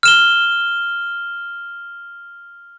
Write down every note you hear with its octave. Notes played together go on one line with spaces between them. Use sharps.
F6 E7 G7